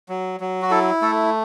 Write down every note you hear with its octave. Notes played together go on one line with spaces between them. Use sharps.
F#3
F#3
F#4
E4 A4
A3 A4